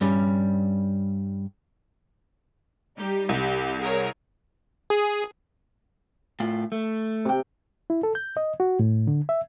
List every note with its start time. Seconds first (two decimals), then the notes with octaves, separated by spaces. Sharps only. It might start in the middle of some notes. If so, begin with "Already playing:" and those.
0.01 G2 G3 C#4
2.98 G3 D#4 G4
3.29 C2 G4
3.80 G#4 A#4 C#5
4.90 G#4
6.40 A2 F4
6.72 A3
7.25 C3 G5
7.90 E4
8.03 A4
8.15 G6
8.37 D#5
8.60 F#4
8.79 A2
9.07 D3
9.29 E5